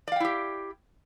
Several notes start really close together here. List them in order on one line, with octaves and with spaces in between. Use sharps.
D5 F5 G5 E4 G4